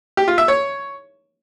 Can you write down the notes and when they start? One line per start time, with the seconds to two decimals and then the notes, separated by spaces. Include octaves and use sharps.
0.17 G4
0.28 F4
0.38 E5
0.48 C#5